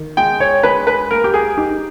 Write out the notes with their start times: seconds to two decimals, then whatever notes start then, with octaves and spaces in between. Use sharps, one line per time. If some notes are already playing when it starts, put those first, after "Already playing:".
Already playing: D#3
0.17 G#3 G5
0.40 C#5
0.63 G#3 B4
0.87 B4
1.11 A#3 A#4
1.24 G4
1.34 G#4
1.57 D#4 G4